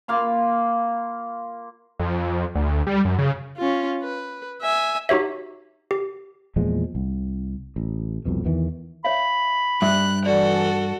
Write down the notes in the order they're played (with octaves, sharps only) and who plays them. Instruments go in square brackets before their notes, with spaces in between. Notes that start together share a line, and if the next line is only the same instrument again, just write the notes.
[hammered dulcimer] A#3 F4 F5 B5
[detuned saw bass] F2
D2
G3
F#2
C#3
[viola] C#4 F4
B4
E5 G#5
[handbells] D#4 F#4 G4 C#5 E5
G4
[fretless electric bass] E2 A#2 F3 G#3
C2
A1
C2 F2 B2
E2 D#3 E3
[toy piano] C#5 E5 F5 [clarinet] B5
[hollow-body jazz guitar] G2 [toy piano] E5 [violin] F#6
[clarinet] E3 [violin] F#4 A4 [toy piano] D5